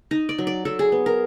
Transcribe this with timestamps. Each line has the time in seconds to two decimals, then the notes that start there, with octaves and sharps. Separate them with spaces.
0.11 D#4 D#5
0.29 D5
0.38 F#3
0.47 D5
0.65 F#3 A4
0.79 G#4
0.92 B3
1.06 A#4